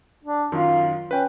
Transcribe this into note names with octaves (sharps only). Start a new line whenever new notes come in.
D4
F#2 D#3 F4
C#4 B4 G5